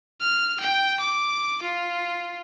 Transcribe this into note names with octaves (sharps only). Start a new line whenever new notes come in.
F6
G5
D6
F4